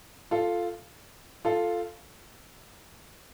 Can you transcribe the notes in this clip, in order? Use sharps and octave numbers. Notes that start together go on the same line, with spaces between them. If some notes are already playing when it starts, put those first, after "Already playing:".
F4 A4
F4 A4